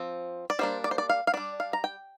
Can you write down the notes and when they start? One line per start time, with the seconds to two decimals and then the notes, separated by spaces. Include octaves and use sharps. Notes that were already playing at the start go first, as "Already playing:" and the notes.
Already playing: F3 C4
0.50 D5
0.59 G3 A#3 D4 C5
0.84 D5
0.91 C5
0.98 D5
1.09 F5
1.27 F5
1.34 G3 D4 D5
1.60 F5
1.73 A#5
1.84 G5